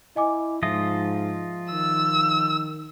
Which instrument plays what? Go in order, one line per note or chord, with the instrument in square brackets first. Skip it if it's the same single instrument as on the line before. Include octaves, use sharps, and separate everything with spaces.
[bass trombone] E4 [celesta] D#5 G#5 D6
[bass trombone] G#2 [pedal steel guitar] F3 F4 D#5 [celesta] E5
[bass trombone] D#3 [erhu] E6